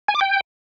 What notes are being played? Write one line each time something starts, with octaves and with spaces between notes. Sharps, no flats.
G#5
D6
G5